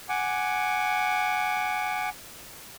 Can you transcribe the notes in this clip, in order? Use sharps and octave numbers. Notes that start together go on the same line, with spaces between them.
F#5 G#5 D6